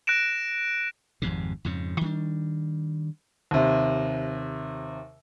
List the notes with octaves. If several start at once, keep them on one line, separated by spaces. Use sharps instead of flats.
F#6 A#6 D7 E7
G#1 F2 G#2 C3
F2 G#2 C#3
D#3 G3 C#4 D4
D#2 C3